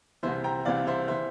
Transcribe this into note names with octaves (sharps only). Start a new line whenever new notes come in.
C2 C3 E3 C5 E5
G5 A#5
C2 C3 E3 D5 F5
C5 E5
E3 C5 E5